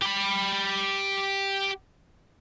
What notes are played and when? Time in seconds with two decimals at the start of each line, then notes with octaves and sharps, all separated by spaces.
0.02 G4 B5